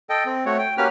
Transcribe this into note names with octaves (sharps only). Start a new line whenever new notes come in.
A4 D#5 G5
C4
A3 F#4 C#5
G5
A#3 C#4 F#4 G4 B4 F6